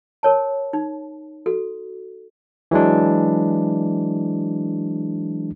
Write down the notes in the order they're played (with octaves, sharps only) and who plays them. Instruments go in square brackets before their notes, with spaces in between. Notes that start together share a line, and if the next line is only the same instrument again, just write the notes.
[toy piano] A#4 C#5 A5
D#4
F#4 A4
[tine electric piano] E3 F#3 G#3 D4